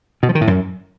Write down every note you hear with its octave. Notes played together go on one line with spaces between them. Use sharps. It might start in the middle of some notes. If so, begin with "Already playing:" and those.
B2
F3
D#3
A2
F#2